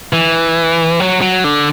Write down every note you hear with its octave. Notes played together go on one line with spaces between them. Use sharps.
E3
F#3
F#3
D3